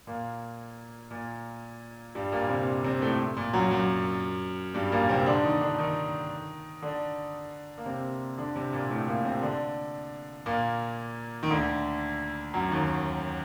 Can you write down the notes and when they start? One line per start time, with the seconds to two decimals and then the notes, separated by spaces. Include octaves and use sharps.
0.07 A#2 A#3
1.11 A#2 A#3
2.15 G2 G3
2.32 A#2 A#3
2.49 C3 C4
2.84 C3 C4
3.02 A2 A3
3.37 A#2
3.53 F#2 F#3
3.71 F#2 F#3
4.74 G2 G3
4.92 A#2 A#3
5.09 C3 C4
5.26 D3 D4
5.44 D#3 D#4
5.61 D3 D4
5.79 D#3 D#4
6.82 D3 D4
7.78 A#3
7.86 C3 C4
8.38 D3 D4
8.56 C3 C4
8.73 A#2 A#3
8.90 A2 A3
9.08 A#2 A#3
9.25 C3 C4
9.42 D3 D4
10.46 A#2 A#3
11.43 D#3
11.50 D2 D3
12.54 F#2 F#3
12.71 D#2 D#3